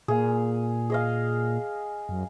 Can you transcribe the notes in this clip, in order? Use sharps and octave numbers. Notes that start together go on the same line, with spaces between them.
A#2 G#4 F5
G#4 D#5 F5
F#2